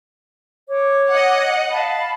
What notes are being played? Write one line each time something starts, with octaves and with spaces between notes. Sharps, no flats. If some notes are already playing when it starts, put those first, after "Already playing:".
C#5 D6
D#5 F#5
F5 A5 B5